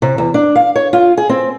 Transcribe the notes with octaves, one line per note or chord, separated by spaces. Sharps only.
C3
E2
D4
F5
C#5
F4
G#4
C4